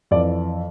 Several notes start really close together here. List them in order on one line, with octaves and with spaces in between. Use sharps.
F2 D5 E3